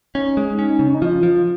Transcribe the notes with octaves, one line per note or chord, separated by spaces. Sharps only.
C#4 D#4
G#3
C#4
C#3
C#4
D#4
F3 F4
F3